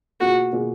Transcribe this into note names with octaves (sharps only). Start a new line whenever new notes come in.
B2 A#3 F4 F#4 G#4
B2 A#3 F4 G#4